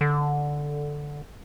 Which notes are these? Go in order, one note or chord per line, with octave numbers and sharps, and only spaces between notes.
D3